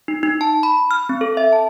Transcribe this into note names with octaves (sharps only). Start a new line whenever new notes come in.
D#4
D#4
A5
B5
F6
C4
A4
E5
A5